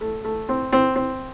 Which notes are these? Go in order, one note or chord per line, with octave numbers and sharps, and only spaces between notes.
A3
A3
C4
C4
C4